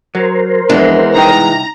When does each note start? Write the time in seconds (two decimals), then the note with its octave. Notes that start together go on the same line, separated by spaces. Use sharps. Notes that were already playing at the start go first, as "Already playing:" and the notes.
0.15 F#3 A#4 C5
0.69 F2 E3 G#3 B3 D4
1.14 C2 D#4 G5 A#5